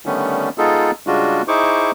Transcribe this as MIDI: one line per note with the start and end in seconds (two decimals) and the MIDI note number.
0.06 0.49 50
0.06 0.49 51
0.06 0.49 55
0.06 0.49 57
0.06 0.49 59
0.06 0.49 61
0.58 0.91 56
0.58 0.91 59
0.58 0.91 63
0.58 0.91 65
0.58 0.91 68
0.58 0.91 69
1.07 1.42 49
1.07 1.42 55
1.07 1.42 56
1.07 1.42 62
1.07 1.42 65
1.07 1.42 66
1.48 1.91 63
1.48 1.91 64
1.48 1.91 68
1.48 1.91 72
1.48 1.91 85
1.48 1.91 86